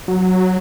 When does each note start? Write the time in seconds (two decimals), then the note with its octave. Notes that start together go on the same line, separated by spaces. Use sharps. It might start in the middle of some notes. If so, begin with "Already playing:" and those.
0.08 F#3